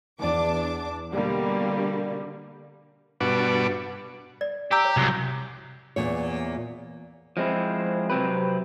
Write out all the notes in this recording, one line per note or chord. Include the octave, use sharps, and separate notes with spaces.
E2 D4 D6
B2 D3 G3 A#3
G2 B2 D4 F#4 B4 D6
D5
G4 A#5 E6
C#5
C2 F#2
E2 A#2 C#5
F3 G#3 C4 E4
C3 F#3 C4 G4 B4